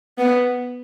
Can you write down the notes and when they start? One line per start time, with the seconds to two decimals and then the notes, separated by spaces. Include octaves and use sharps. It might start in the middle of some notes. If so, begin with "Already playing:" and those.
0.18 B3